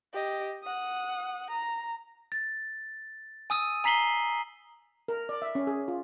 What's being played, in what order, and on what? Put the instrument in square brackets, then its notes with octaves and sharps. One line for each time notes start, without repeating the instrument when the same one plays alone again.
[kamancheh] G4 D#5
F#5 D#6
A#5
[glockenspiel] A6
G#5 D#6 E6 D#7
G#5 A#5 B6 C7 F#7 G7
[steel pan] A#4
D5
E5
C#4
G#4
F4